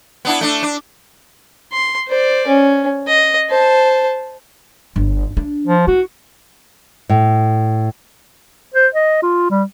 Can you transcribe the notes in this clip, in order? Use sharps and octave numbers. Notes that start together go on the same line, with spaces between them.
B3 D4 E4
A3 D4
D4
C6
C5 D5
C#4
D#5
C5 A5
G1
D4
F3
E4 F#4
A2
C5
D#5
F4
G3